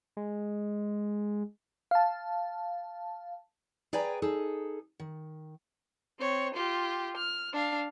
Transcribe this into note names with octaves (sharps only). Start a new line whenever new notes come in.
G#3
F5 A5
G#4 B4 D5 G5 G#5 A#5
D#4 G#4 A4
D#3
C4 C#5
F4 G4
F6
D4 F5